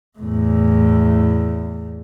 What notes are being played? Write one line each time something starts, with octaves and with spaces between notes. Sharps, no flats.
E2 A2